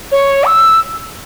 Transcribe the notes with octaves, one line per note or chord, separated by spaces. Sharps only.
C#5
E6